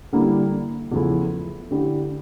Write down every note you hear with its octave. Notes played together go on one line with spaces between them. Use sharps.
D3 G3 A#3 E4
E2 C#3 F3 A3 E4
D3 A3 E4 G4